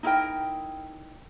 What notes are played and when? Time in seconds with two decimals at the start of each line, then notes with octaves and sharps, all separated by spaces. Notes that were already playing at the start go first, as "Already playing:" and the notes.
0.03 D#4 E4 A#4 G5